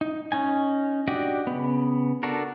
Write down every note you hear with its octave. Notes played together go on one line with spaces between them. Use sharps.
D#4
C#4 D#4 G#5
D4 F#4 G4 D5 D#5
C#3 B3
D4 F#4 A4 A#4